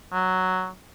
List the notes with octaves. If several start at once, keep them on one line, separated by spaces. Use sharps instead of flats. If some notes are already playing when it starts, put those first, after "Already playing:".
F#3